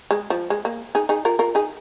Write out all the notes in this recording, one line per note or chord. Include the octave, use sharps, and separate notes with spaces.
G#3
F3
G#3
A#3
D#4 G#4
D#4 G#4
F4 A#4
F4 A#4
D#4 G#4